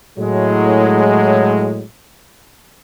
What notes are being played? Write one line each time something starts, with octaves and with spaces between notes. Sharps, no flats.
A2 F#3 G#3